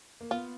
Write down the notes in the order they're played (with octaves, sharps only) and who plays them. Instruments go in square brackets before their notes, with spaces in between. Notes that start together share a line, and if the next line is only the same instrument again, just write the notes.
[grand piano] A#3
[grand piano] B3 [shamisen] F4